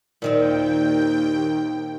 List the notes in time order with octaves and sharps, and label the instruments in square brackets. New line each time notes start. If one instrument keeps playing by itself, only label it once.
[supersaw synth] D#2 G5 [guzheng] A#2 D#3 C4